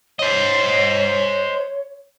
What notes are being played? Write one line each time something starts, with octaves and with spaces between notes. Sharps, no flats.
C5 C#5 D#5